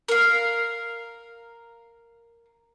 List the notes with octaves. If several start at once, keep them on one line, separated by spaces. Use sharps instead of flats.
A#4 F5